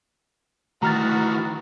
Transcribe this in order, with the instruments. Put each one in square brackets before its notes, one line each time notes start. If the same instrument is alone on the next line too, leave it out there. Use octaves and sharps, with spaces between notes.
[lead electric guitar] D#3 E3 [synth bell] A3 [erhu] F#4 [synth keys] A#5 F6 A6